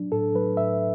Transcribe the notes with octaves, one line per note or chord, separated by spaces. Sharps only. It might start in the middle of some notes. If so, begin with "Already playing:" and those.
Already playing: F#3 D4
A2 A4
F#3 B4
A2 E5